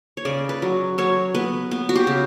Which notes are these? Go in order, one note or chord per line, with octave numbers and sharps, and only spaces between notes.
C#5
C#3 D5
B4
F#3
F#3 C#5
B3 B4
B3
F#4
G4
C#3